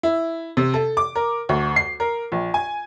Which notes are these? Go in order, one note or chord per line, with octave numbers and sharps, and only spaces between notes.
E4
C3
A4
D6
A#4
D2
C7
A#4
A#1
G#5